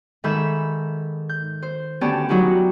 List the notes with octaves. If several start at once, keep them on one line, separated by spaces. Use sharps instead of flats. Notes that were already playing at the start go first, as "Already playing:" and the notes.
G#2 D#3 A4 E5 B5 G6
G6
C5
D2 B3 C#4 G4 D5 A5
F#3 D#4 E4 F#4 G4